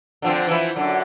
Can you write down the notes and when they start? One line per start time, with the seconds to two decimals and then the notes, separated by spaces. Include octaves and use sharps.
0.22 D3 F3 C4
0.47 E3 F3 E4
0.76 F#2 D3